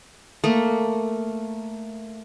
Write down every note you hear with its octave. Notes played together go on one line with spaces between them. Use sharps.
A3 A#3